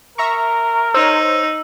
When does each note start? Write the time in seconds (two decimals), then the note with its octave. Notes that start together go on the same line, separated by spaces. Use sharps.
0.18 A#4 E5 A#5 C#6
0.94 D#4 C5 C#5 E6